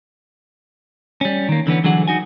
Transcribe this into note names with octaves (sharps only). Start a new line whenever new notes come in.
G3 C#4
D#3 A#3
D3 E3 B3 C#4
D3 E3 F#3 G#4 F#5
D#4 F#4 G#5